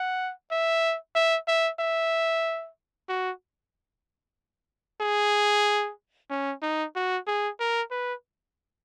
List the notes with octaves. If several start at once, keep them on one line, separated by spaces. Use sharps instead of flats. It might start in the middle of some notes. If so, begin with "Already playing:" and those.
Already playing: F#5
E5
E5
E5
E5
F#4
G#4
C#4
D#4
F#4
G#4
A#4
B4